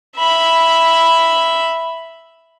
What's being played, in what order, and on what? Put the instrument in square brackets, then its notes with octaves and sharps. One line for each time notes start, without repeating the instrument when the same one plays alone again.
[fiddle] E5 B5